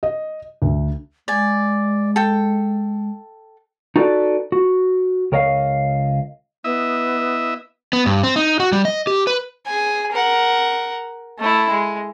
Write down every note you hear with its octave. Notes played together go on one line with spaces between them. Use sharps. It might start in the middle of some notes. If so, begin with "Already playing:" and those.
D#5
D2
G#3 D5 G#5
A4 G5
D#4 F#4 A4 B4 C#5 D5
F#4
C#2 A#4 C#5 D#5 F5
B3 E4 D#5 E5
B3
G2
C4
D#4
F#4
G3
D#5
G4
B4
G#4 G#5
A#4 F#5
A3 E4
G#3